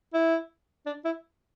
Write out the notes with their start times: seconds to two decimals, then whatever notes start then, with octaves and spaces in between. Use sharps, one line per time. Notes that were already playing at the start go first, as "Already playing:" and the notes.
0.14 E4
0.86 D4
1.05 E4